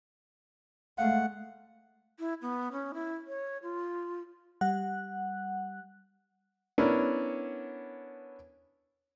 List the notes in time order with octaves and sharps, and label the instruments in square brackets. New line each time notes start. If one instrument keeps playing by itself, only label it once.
[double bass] G#3 A3 [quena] F5 [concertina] F#5
[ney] E4
B3
C#4
E4
C#5
F4
[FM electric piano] G3 F#5 F#6
[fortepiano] B3 C#4 D4 E4 A#4